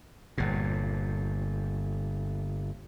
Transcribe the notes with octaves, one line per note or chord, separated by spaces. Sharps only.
G1 A#2